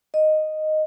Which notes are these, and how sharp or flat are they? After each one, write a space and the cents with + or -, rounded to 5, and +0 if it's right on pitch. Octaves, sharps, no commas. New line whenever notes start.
D#5 -5